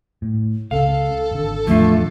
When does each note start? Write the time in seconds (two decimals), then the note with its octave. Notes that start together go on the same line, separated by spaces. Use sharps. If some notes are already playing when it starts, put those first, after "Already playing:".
0.22 A2
0.71 C#2 C#3 A4 F5
1.31 G#1 D3
1.67 E2 A2 D3 F3 A3 F4